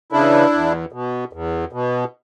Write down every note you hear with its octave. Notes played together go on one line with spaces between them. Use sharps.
C#3 E3 D4 E4
E2
B2
E2
B2